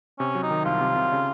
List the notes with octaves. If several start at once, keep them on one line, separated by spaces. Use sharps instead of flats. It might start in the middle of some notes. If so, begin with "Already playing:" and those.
C3 C#4
F#3
D#4
D#3
C2 F4
C3
C3
C#3